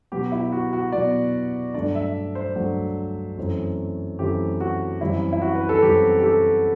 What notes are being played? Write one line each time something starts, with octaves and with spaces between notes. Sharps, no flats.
B2 F#3 B3 G4
E4
F#4
F#4
B2 F#3 B3 D5
G2 F#3 A3 D4 D5
E5
C5
G2 F#3 A3 D4
F#2 E3 A3 C4
F#2 E3 A3 C4 G4
F#4
F#2 E3 G3 C4 E4
E4
F#4
B4
A4
F#2 E3 G3 C4 G4
G4
A4